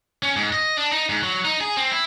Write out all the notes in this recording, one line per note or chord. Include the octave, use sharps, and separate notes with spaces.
C#4
G#2
D#5
D4
D#4
G#2
F#3
D#4
G#4
C4
E4